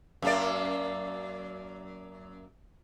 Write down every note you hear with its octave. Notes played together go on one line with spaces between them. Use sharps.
F#2 A#3 D5